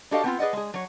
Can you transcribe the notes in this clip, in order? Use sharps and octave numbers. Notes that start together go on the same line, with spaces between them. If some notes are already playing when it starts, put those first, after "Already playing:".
D4 F#4 G4 A4 D#5 F5
B3 C4 F4
G#4 B4 D5 D#5 F#5
G#3 G#4
F#3 C#5